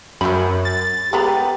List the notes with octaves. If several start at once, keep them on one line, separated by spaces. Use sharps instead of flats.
F#2 F#3 B5
A6
G#3 B3 G4 A#5